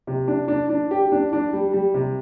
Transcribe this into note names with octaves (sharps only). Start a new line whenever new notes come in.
C3
D4
D4
D4
G4
D4
D4
G3
G3
C3